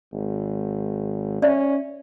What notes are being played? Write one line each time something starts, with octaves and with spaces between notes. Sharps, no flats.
G#1
C#4 D5 E5